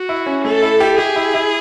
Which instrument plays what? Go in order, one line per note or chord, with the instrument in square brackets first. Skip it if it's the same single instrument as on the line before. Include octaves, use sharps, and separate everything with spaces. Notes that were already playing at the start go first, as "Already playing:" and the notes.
Already playing: [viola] F#4
[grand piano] E4
C#4
[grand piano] A3 [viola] A4
[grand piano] E4
G4
[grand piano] G4 [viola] G#4
[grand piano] E4
E4